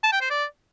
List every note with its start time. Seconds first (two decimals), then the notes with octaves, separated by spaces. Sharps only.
0.03 A5
0.12 G5
0.21 C5
0.30 D5